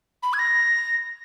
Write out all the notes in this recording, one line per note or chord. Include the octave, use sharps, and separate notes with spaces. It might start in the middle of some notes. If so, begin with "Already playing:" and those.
B5
G#6
A#6